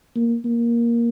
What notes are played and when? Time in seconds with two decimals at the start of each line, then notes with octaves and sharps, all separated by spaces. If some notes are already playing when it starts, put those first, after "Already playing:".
0.16 A#3
0.45 A#3